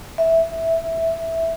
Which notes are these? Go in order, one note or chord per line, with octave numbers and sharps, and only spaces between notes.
E5